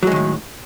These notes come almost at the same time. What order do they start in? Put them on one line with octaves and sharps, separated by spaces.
F#3 G#3 D#3 A2